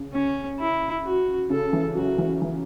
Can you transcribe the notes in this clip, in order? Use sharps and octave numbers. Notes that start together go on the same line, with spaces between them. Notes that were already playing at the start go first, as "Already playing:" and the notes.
Already playing: C#3
C#4
E4
F#4
C#3 A4
E3
F#3 F#4
E3
E3